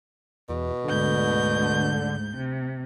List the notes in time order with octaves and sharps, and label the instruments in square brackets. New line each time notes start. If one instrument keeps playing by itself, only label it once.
[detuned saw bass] E2 [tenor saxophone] B2
[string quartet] D2 G#2 G6 [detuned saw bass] D3
[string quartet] C3